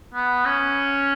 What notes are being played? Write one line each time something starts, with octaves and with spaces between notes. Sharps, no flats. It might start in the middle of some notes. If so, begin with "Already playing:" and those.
B3
C#4